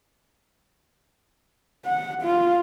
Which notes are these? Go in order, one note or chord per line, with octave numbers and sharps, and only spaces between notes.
F#5
F4